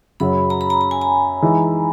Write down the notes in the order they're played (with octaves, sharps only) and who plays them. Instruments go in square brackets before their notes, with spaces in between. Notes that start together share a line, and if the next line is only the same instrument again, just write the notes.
[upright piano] F#2 C#3 F#3 C#4 [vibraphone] B5
[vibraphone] A#5
B5
A#5
A#5
G#5
A#5
[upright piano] E3 G#3 D#4